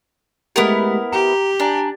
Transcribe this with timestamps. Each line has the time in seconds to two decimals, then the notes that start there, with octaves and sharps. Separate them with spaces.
0.56 G#3 A3 B3 E4 G4 A#4
1.12 G4 A#5
1.60 D4 G#5 A#5